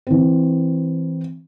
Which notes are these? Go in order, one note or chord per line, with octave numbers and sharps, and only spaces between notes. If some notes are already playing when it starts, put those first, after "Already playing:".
E3 C4